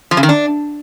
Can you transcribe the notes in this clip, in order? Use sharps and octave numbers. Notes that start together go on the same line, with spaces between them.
F3
C#3
D#3
D4